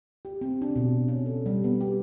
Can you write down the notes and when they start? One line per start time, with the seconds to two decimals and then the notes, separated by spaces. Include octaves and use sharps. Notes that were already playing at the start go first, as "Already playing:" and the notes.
0.25 G4
0.41 C4
0.62 D4
0.76 B2
1.08 C#4
1.26 A4
1.46 G3
1.64 B3
1.81 G4